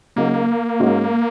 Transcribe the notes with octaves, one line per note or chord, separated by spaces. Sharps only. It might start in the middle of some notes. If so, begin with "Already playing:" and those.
C#3 F#3 A#3 D#4 F#4
G#2 G#3 C#4 F#4